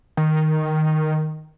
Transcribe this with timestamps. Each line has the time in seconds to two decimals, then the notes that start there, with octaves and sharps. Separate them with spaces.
0.17 D#3